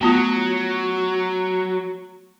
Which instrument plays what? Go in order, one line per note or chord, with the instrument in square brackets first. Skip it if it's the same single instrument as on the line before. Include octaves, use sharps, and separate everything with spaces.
[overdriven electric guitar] F#3 [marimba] A3 B3 F4